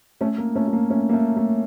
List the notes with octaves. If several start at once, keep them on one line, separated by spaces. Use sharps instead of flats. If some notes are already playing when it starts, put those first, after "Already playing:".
A3 C#4
A#3
A3 C#4
A3
A#3
A3 C#4
A#3
A3
A3